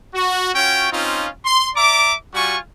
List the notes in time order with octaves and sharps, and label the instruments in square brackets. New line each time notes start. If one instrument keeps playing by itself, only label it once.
[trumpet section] F#4
C#4 F4 F#4 C#5 G5
C4 C#4 D#4 F4
C6
D5 E5 A#5 D6
G3 F4 F#4 G#5 C#6